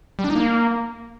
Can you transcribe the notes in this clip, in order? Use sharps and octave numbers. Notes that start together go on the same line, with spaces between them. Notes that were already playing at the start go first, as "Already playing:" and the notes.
G3
D4
D#4
A#3